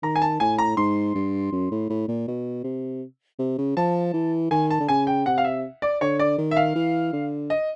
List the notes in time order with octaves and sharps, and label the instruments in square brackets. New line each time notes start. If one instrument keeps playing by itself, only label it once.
[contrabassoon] D#3 [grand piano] A#5
[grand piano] G#5
A5
[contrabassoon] A2 [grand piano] G#5
[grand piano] A#5
[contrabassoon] G#2 [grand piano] C6
[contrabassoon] G2
F#2
A2
A2
A#2
B2
C3
C3
C#3
[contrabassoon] F3 [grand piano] A5
[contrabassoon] E3
[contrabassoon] D#3 [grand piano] G#5
[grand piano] A5
[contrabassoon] D3
[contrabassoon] C#3 [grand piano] G#5
[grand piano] G5
[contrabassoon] C3 [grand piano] F#5
[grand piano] F5
E5
D5
[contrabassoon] D3 [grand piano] C#5
[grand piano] D5
[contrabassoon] D#3
[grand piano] E5
F5
[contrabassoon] E3
D3
[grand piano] D#5